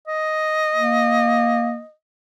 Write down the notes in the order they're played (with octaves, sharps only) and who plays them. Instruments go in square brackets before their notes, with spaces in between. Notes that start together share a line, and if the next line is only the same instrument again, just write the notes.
[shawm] D#5
[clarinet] A#3